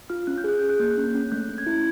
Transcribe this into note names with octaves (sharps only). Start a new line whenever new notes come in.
F4 F6
C#4 F#6
G6
G#4 F#6
G#4 G6
F#6
A#3 G6
F#6
C#4
C#4
A3 G6
C#4
G#6
E4